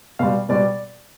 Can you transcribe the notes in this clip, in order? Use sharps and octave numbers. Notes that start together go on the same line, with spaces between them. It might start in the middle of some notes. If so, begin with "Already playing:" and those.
B2 G3 F5
B2 G3 D5